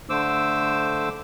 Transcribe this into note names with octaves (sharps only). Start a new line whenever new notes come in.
D3 A3 C5 D6 E6